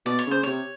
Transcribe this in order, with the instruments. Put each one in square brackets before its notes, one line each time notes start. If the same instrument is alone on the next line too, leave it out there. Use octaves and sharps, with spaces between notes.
[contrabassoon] B2 [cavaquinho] D5
[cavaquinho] C#5
[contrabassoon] C#3 [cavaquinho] C5
[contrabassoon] C3 [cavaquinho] C#5